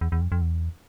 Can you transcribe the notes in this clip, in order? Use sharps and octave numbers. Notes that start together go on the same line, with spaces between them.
E2
E2
F2
F2
E2